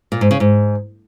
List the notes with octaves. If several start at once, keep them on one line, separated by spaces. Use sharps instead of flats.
A#2
G#2
C#3
G#2